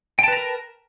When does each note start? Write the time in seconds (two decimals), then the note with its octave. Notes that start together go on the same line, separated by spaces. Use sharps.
0.19 G5
0.23 A5
0.28 B4
0.32 A#5
0.37 A#4